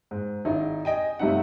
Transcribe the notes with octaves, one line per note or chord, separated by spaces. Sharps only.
G#2
G#1 D#4 E4
D#5 G5 G#5
G1 C3 G3 A3 D#4 F#5